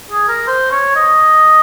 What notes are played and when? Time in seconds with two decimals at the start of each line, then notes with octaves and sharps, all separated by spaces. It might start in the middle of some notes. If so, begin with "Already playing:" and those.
0.11 G#4
0.28 A#4
0.47 C5
0.71 C#5
0.95 D#5